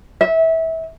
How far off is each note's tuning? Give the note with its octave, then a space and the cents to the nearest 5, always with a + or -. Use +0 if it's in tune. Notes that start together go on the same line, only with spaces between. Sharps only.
E5 -25